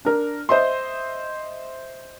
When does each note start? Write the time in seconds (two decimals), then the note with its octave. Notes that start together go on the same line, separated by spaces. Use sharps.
0.05 D4 A#4
0.49 C5 D#5 E5 C6